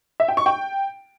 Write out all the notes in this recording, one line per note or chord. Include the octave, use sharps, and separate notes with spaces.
E5
G5
C#6
G5